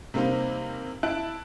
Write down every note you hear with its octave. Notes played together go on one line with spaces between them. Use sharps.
C3 G3 A#3 C4 D#4
E4 A5 F#6 D7